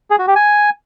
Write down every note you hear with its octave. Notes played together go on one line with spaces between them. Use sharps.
G#4
F#4
G4
G#5